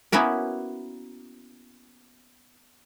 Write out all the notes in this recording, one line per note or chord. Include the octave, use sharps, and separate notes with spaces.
A#3 B3 C#4 E4 F#4 A#4